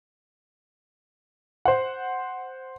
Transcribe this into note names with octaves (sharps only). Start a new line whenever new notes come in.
C5 F#5